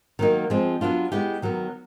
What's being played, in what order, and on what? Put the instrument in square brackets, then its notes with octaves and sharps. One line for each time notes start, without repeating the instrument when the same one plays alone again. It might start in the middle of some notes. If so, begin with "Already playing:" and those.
[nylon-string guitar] D#3 F#3 A#3 D#4
F3 G#3 C4
F#3 B3 D4 F4
G#3 B3 E4 G4
D#3 F#3 B3